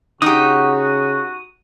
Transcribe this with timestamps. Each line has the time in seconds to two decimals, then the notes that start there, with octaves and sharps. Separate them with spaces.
0.22 C#3 D#4 F#4 G4 D#6